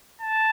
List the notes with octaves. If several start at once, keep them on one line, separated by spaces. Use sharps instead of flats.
A5